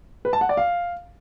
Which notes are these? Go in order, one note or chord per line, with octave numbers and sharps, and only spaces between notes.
B4
A5
F#5
D5
F5